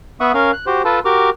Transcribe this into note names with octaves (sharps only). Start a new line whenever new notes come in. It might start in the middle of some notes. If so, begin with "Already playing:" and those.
B3 E5 F#5 C#6 D#6
C#4 A#4 F5 F6
F#6
F#4 G4 C5
F4 A4 B4 A5
F#4 G4 A#4 D6 F6